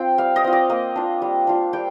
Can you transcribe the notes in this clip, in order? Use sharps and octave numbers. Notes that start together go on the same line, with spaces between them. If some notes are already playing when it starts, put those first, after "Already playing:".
Already playing: C4 F4 G5
G3 F5
D#5
C4 F4
D5
A#3 D#5
D4 F4
G3
D4 F4
G3 G5